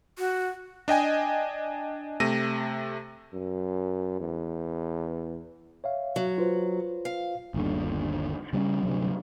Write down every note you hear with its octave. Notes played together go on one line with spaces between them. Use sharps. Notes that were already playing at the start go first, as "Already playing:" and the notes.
F#4
D4 D#5 G5 G#5
C3 A3 A#6 D#7
F#2
E2
C#5 E5 F5
F#3
F4 B4 C5
F5
G1 D#2 D3
C#3 G3 C4 C#4
D2 G2 C3 F#3